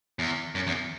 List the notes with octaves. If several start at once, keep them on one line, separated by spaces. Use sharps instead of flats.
E2
F#2
E2